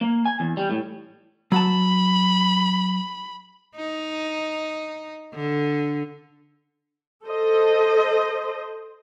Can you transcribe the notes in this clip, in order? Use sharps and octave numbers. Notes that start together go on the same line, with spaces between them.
A#3
G#5
E2
G3
A2
F#3 F#5 A5 B5
D#4
D3
A4 C5 D#5